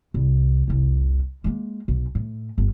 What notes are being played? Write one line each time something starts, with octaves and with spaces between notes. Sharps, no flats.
C2
F1 C2
G#3 A#3
B1
A2
G1